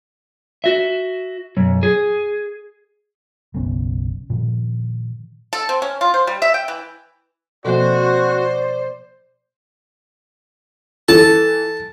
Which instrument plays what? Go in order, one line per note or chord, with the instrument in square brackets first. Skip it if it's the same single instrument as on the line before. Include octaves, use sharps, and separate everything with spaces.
[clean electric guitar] F#4 E5
B1 F#2
G#4
[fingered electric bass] F#1 B1 B3 C#4
A#2 D#3 F3
[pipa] A4
C4
C#4
F4
C5
G3
E5
G5
E3
[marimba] B2 F3 A#3 [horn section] C4 F#4 [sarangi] C5 [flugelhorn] D5
[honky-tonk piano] E3 [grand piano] A4 [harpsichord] A5